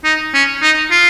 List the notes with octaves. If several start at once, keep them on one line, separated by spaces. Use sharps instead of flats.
D#4
C#4
D#4
F4